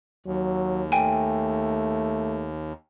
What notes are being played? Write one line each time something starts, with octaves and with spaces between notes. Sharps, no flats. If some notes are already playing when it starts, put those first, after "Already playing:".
D#2 F#3
A3 G5 G#5